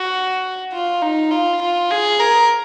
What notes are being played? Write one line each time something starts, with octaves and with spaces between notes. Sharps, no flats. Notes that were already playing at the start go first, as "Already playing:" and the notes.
Already playing: F#4
F4
D#4
F4
F4
G#4
A#4